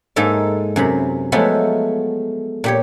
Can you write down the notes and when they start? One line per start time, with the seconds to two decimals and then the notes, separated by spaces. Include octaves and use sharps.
0.16 G#2 A#3 D#4 A4 E5
0.76 F#2 C3 B5
1.32 F3 F#3 G#3 A3 B3 A4
2.64 A#2 G4 C#5